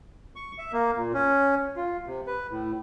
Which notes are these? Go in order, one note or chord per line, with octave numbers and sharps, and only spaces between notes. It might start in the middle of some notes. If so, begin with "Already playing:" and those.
C#6
E5
A#3
A#2
C#4
F4
C3
B4
A2